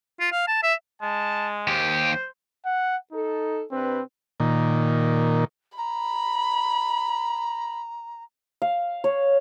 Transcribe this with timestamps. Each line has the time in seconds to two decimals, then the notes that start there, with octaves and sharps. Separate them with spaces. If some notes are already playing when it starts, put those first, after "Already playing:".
0.20 F4
0.32 F5
0.48 A5
0.63 E5
1.02 G#3 A5
1.68 D#2 G4 C5
2.66 F#5
3.12 D#4 A4
3.71 C3 C4 D4 B4
4.40 A#2 D#3
5.78 A#5 B5
8.62 F5
9.04 C#5